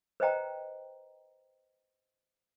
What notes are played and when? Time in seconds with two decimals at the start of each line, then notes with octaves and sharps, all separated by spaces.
0.20 B4 C5 D#5 G5 A#5